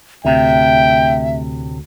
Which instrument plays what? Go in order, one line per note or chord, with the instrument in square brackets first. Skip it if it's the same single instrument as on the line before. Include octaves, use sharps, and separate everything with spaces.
[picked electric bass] D2 [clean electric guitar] A2 C3 [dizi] E5 [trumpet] G5